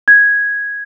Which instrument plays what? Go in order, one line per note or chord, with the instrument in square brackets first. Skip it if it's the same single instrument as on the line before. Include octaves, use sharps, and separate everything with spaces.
[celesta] G#6